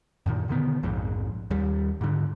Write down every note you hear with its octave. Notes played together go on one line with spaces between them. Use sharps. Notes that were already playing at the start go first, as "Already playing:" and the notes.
F#2 A#2 D#3
B2 D3 D#3 B3
A#1 F2 G#2
D#2 G3
G#2 D3